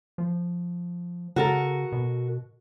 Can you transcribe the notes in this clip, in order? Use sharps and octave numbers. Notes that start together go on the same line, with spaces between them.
F3
C#3 F#4 A4 A#4
B2